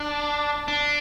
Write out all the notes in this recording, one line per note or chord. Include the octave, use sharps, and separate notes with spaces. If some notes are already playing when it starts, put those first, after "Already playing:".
Already playing: D4
D4